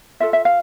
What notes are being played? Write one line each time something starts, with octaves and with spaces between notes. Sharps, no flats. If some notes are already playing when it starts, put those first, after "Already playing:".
F4 A4 E5
E5
F5